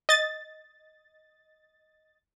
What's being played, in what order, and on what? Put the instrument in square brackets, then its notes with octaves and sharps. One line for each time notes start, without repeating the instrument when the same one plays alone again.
[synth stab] D#5 A6